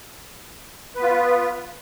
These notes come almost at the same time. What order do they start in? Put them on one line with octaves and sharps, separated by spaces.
B4 B3 F4